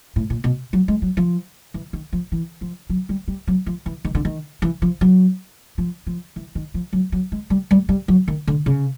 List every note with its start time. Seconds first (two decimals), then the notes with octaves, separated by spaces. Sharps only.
0.16 A2
0.30 A#2
0.44 B2
0.73 F#3
0.88 G#3
1.02 F#3
1.17 F3
1.74 E3
1.93 D#3
2.13 F3
2.32 E3
2.61 F3
2.90 F#3
3.09 G3
3.28 G3
3.47 F#3
3.67 F3
3.86 E3
4.05 D#3
4.15 D3
4.25 D#3
4.62 E3
4.82 F3
5.01 F#3
5.78 F3
6.07 F3
6.36 E3
6.55 D#3
6.74 F3
6.93 F#3
7.12 F#3
7.32 G#3
7.50 G3
7.71 G3
7.89 G3
8.08 F#3
8.28 D#3
8.47 D3
8.66 C#3